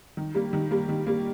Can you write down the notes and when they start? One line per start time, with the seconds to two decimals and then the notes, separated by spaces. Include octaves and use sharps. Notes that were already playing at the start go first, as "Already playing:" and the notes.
0.17 D#3
0.35 G3 A#3
0.53 D#3
0.71 G3 A#3
0.89 D#3
1.07 G3 A#3